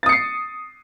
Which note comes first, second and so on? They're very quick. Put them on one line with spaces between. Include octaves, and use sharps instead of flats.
A6 D#6 C#7 C7